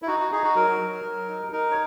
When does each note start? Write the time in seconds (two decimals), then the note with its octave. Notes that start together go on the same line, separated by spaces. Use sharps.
0.02 E4
0.07 D#4 F#4
0.20 F#4
0.32 D#4 G#4
0.44 F#4
0.56 F#3 A#4
0.80 F#3
1.05 F#3
1.29 D#4
1.52 D#4 A#4
1.71 C#5